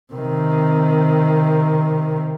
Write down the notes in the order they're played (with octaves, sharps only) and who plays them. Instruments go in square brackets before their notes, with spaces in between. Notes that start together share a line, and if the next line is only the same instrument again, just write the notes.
[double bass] C3 D#3